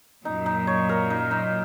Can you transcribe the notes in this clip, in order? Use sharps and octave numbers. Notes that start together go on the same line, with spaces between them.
F#2 A#2 D#4
D#4
C#5
A#4
D#4
D#4